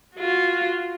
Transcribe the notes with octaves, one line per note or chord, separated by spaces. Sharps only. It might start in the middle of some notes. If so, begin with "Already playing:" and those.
F4 F#4